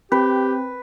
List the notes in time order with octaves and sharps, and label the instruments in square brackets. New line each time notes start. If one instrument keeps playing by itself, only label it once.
[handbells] C4 [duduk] G4 [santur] B4